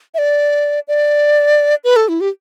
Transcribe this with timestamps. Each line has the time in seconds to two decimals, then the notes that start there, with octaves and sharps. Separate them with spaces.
0.14 E5
0.18 D5
0.88 D5
1.84 B4
1.96 A4
2.09 E4
2.21 G4